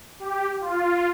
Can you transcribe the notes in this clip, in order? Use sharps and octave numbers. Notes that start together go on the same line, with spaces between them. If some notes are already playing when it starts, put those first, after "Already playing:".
G4
F4